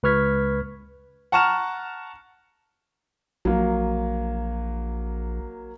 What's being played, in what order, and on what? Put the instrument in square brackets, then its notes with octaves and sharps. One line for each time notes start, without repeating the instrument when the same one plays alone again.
[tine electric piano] C#2 B4 C#6 F6 G#6 B6
[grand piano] F#5 A5 A#5 C#6 F6 E7
[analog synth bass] A#1 [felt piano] F#3 A#3